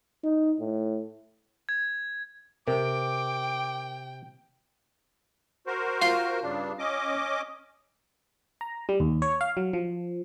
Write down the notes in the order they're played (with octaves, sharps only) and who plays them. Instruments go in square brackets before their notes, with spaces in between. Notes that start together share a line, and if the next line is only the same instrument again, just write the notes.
[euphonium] D#4
A2
[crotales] G#6
[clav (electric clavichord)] C3 [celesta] A#4 [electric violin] G5 [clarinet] D6
[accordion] F#4 A#4 C5
[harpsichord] F4 C6
[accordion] G2 C#3 D4
C#4 D#5 D6
[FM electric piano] A#5
G3
D#2
C#5
F5
F#3
F3